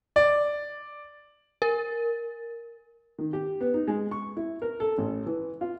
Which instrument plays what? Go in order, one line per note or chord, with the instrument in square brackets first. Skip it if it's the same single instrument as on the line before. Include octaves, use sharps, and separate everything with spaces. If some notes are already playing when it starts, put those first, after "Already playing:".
[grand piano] D5
[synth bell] A#4
[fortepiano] D#3
G4
B3
D#4
G#3
C#6
E4
A#4
A4
A1
E3
F4